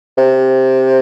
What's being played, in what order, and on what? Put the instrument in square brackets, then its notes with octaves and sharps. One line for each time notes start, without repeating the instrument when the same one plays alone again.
[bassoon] C3